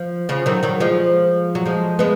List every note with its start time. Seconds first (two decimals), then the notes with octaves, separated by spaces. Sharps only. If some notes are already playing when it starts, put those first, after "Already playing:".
Already playing: F3
0.29 C#3 F3
0.46 D#3 F#3
0.63 D#3 F#3
0.80 F3 G#3
1.55 F#3
1.66 F3 G#3
1.99 G#3 B3